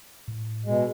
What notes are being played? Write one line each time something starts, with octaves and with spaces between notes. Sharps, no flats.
A2
B2 G#3